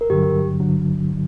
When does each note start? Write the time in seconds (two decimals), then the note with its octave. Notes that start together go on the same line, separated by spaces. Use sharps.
0.01 A#4
0.10 G2 D3 F#3 G4
0.60 D3 F#3